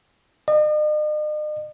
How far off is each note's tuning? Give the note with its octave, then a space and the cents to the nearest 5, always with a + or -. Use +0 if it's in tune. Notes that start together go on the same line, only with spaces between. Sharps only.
D#5 -45